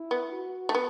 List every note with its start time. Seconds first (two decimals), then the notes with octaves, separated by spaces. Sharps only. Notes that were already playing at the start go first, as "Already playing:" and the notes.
Already playing: E4
0.11 B3
0.32 F#4
0.69 A3
0.75 B3